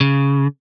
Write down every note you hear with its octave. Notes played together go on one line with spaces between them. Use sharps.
C#3